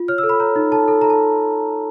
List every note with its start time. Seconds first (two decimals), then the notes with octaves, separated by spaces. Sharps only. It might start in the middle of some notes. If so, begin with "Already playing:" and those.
Already playing: F4
0.08 C#5 F6
0.18 E6
0.23 A4
0.29 B5
0.40 C#5 A#5
0.56 D#4
0.72 A4 A5
0.88 A4
1.01 A4 A#5
1.10 A5